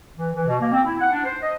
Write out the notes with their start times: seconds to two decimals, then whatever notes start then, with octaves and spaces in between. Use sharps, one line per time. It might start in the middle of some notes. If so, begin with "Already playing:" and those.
0.16 E3
0.34 E3
0.47 B2
0.61 A#3
0.72 C4
0.84 E4
0.99 F#5
1.11 D4
1.24 C5
1.41 D#5